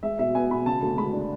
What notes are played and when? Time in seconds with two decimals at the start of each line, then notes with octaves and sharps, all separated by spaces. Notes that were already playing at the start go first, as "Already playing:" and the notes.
0.03 G#3 E5
0.19 B2 E5
0.35 B3 G#5
0.51 B2 B5
0.66 C#3 A5
0.82 D2
0.97 G#3 B5
1.13 D4